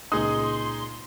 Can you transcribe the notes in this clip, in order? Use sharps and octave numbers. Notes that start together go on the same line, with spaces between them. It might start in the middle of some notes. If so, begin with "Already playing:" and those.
C#2 A#2 D#4 G#4 C6 D#6